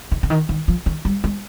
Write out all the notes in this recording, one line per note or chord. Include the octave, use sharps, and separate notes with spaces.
D#3
D3
D#3
D#3
F3
D#3
G3
G#3